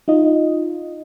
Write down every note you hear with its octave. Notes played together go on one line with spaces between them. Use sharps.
D#4 F4 D#5